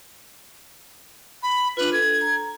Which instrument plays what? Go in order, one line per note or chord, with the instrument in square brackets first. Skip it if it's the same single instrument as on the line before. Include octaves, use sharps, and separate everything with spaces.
[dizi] B5
[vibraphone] D4 F4 [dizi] B4
[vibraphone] A4 [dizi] G#6
[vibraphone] A#5